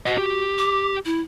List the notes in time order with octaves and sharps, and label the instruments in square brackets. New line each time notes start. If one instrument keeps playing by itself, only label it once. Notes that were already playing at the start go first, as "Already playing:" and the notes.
[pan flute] F#4 [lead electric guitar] D#5 F#5
[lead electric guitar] G4
[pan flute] D6
E4